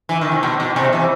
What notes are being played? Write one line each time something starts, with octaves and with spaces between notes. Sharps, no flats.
E3
D#3
C3
B2
B2
C3
E3